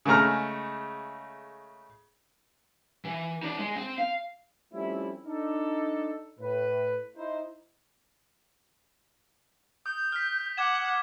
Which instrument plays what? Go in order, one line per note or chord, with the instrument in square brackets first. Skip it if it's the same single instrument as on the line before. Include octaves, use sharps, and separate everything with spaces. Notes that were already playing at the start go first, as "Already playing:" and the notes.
[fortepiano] C#3 G#3 A3 A#5 F6
[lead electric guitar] E3
D#4 D5
G#3
C4
F5
[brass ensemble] F3 G3 A3 C4 C#4 E4
D4 D#4 A4
A2 B4
D#4 E4 C5
[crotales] D#6 [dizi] G6
[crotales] F6 B6
[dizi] F#5 [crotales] D6 G#6 E7